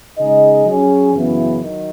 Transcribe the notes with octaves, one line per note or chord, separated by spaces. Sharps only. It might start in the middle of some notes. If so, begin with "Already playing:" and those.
C#3 G#3 D#4 G#4 D#5
F#3 C#4 G#4
F#2 C#3 E3 B3 E4
D#3 F#3